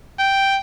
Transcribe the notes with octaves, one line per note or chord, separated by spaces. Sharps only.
G5